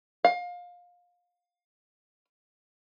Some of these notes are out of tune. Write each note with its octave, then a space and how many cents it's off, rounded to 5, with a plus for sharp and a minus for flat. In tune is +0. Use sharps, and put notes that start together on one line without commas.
F5 +25